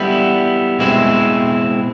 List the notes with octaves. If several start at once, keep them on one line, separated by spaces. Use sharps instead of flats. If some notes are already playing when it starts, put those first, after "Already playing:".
Already playing: G3 B3 E4
B2 G#3 C4 E4